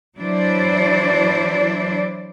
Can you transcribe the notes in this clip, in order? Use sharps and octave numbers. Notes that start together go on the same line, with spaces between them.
E3 F#3 D4 E4 C5 D5